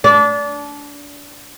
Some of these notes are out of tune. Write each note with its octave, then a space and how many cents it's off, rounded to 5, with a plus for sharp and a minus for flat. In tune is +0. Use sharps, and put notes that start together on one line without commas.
D4 -25